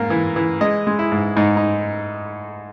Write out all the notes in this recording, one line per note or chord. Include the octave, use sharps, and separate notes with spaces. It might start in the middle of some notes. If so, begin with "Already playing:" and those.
Already playing: G#2 A#3
E3
E3
G#3 D#5
G#3
E4
G#2
G#2 D#4
D#4